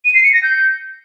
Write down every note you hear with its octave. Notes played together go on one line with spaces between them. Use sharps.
D#7
C7
C#7
A#6
G6